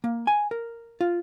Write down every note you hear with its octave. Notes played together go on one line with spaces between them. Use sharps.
A#3
G#5
A#4
F4